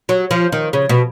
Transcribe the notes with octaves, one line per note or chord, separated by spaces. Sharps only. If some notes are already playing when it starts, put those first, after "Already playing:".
F#3
F3
D#3
C#3
B2